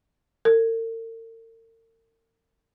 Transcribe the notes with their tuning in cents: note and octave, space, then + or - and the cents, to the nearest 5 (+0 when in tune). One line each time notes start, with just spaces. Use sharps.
A#4 -45